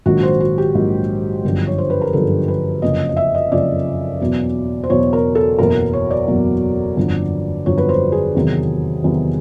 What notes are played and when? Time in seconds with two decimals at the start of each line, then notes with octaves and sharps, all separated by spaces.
0.06 A#1 G#2 D#3 F#3 F#4
0.23 C5
0.40 F#4
0.58 G4
0.75 A#1 G#2 D#3 F#3
1.44 G1 F#2 D3 F3
1.67 C#5
1.78 C5
1.90 B4
2.02 A#4
2.13 G1 F#2 D3 F3 A4
2.48 B4
2.82 F#1 F2 C#3 D#5
3.09 D#5
3.17 E5
3.35 D#5
3.52 F#1 F2 C#3 D5
4.20 E2 B2 F#3
4.84 C5
4.90 E2 B2 F#3 C#5
5.13 A#4
5.35 A4
5.58 F#1 E2 B2 F#3 A#4
5.93 C#5
6.11 D5
6.28 F#1 E2 B2 F#3
6.97 G1 F2 D3 F#3
7.66 G1 F2 D3 F#3 C#5
7.78 B4
7.89 C5
8.12 G#4
8.35 E2 C3 D#3 F#3
9.04 E2 C3 D#3 F#3